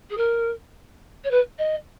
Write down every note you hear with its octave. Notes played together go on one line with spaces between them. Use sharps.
G#4
A#4
C#5
B4
D#5